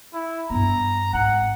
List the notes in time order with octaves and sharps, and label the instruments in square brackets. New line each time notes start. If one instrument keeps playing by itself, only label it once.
[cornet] E4
[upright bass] G2 B3 [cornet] A#5
[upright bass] G#1 [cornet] F#5